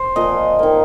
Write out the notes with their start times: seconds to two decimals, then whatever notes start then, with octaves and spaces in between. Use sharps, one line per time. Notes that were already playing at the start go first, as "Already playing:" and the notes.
Already playing: C5
0.16 A#2 F3 A#3 D#5
0.59 D#3 A#3